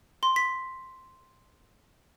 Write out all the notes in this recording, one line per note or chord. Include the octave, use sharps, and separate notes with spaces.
C6
B6